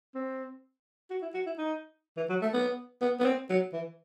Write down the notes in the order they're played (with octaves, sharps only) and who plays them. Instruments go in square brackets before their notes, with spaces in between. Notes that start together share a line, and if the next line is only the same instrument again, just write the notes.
[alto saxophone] C4
F#4
E4
F#4
E4
D#4
E3
F#3
A3
B3
B3
B3
C4
F#3
E3